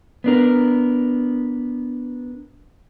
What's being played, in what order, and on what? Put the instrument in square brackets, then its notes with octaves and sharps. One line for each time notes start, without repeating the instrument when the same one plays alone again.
[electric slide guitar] B3 D4 A#4